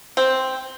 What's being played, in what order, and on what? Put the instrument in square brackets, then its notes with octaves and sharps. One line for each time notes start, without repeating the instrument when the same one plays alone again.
[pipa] C4